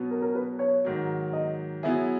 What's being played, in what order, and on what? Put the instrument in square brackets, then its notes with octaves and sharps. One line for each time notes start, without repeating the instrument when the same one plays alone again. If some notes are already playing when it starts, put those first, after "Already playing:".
Already playing: [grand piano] B2 F#3 B3
[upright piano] A#4
A#4
B4
C#5
[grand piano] G#2 D#3 F#3
[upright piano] D#5
[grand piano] F#3 B3 E4 G#4 [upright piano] E5